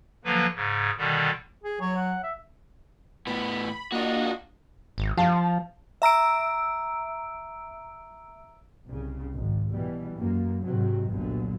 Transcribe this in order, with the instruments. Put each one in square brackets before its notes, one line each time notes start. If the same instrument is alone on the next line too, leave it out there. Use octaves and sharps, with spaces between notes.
[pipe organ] D3 F3 F#3 A#3 B4
G#2 C#3
B2 D3 D#3 G3
[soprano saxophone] G#4
[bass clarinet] F#3 [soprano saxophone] C#5
[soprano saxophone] F#5
E5
[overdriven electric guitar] A2 B3 [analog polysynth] B5
[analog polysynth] A#3 D4 D#5 [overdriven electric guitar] F4 F#4
[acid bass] G#1
[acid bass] F3 [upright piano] F5 A5
[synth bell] E5 A#5 E6 D7
[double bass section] C2 C#3
G#1
B2 E3 G3
F#2 A#3
G#2 C3 D#3 F#3
G1 C2 G2 A#2 D3 F#3